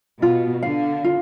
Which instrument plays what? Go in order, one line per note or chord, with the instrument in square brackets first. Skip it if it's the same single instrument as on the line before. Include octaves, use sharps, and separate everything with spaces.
[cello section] B2 [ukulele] F4
[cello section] D3 [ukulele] F5
[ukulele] F4